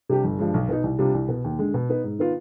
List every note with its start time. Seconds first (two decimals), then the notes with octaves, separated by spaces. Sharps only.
0.09 C3 G3 D4 G4
0.24 G1
0.39 G2 D3 F3 G#3
0.54 B1
0.69 B2 B3 D#4
0.84 C2
0.99 C3 G3 D4 F4
1.14 C2
1.28 B2 B3
1.44 D#2
1.59 D3 G#3
1.74 B2
1.89 B3 D#4
2.04 G#2
2.19 D#3 B3 F4